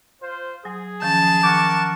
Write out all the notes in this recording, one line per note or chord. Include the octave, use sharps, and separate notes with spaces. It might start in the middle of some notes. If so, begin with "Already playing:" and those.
F4 C5
F#3 G#4
D#3 F3 C#4 A5
D#3 A#4 F#5 C#6 D6